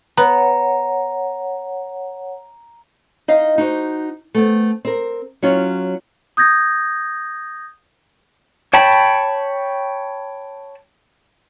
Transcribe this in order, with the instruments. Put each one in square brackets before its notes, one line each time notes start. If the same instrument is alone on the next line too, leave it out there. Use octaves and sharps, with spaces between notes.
[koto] B3 [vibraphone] C#5 F#5 [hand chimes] A#5
[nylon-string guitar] D#4 D#5 F5
D#4 F#4 C5
A3 B3 C4
C4 A#4
F#3 C#4 F4
[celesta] D#6 G6 G#6 A#6
[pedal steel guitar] C#5 G5 A5 B5